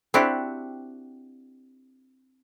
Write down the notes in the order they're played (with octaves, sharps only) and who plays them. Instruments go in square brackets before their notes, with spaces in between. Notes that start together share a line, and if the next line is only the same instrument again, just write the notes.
[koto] C4 D4 E4 F#4 G4